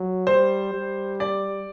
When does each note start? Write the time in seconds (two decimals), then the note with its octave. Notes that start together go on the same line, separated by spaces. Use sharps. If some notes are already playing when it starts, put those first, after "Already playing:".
Already playing: F#3
0.27 G3 C5
0.73 G3
1.20 D5